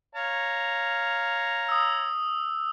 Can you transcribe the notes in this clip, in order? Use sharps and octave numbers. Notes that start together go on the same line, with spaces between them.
C#5 F5 A#5
D#6 E6